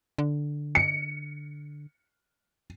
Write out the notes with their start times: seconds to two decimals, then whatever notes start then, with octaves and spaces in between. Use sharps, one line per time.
0.18 D3
0.75 C#7